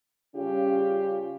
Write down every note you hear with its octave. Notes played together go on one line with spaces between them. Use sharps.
C#3 G3 C#4 F4 G4